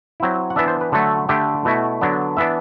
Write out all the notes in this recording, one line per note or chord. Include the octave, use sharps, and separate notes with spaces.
F#3 C4 E4
F#5
E3 B3 D4 E5
C5
B4
D3 F#3 A3 A4
D3 A3 D4 G4
B2 A3 E4 F#4
D3 F#3 B3 D4
E3 B3 D4 E5